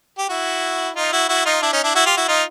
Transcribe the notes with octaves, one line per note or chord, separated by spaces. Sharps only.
G4
E4 F#4
D#4 F4
E4 F#4
E4 F#4
D#4 F4
D4 E4
C#4 D#4
D4 E4
E4 F#4
F4 G4
E4 F#4
D#4 F4